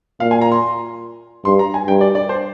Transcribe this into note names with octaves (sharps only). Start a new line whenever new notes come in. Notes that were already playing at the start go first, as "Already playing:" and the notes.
A#2 F5
G#5
A#5
C6
G2 C6
A#5
G#5
G2 G5
D5
D5
C5